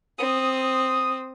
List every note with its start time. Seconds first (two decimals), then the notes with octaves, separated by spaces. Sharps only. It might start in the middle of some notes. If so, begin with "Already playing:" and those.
0.18 C4 D#6